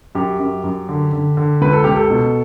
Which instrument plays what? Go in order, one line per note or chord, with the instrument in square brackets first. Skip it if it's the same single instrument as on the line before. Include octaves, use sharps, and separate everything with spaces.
[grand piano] F#2 G4
F#2
F#2
D3
D3
D3
C#2 B4
A4
C#2 G4
A4
B2